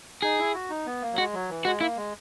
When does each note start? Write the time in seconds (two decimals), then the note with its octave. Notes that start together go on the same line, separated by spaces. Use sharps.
0.22 D#4 G#4
0.39 E4
0.54 F#4
0.70 D#4
0.86 B3
1.02 A#3
1.13 F#3
1.18 G#3 F#4
1.34 F#3
1.49 E3
1.65 G#3 F#4
1.81 A#3 E4
1.97 G#3